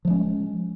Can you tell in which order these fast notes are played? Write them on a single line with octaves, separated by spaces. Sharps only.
F3 G#3 C#4